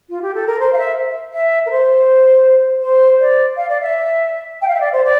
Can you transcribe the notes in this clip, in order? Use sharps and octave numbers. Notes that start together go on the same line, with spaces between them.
F4
G4
A4
A#4
C5
F5
E5
E5
A#4
C5
C5
D5
F5
D5
E5
G5
F5
E5
D5
C5
D5